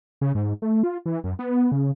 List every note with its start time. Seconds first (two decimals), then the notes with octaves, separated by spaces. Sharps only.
0.21 C#3
0.35 G#2
0.62 A3
0.83 F4
1.06 E3
1.24 F#2
1.39 B3
1.72 C#3